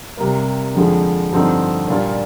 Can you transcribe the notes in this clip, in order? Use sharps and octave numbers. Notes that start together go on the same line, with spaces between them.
C3 G3 A#3
F2 D3 F3 G#3
G2 D3 F3 C4 D#4
A#2 G3 D4 F4